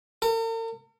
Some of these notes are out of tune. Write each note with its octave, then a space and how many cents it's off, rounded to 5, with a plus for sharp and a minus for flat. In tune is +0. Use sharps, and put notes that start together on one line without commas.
A#4 -45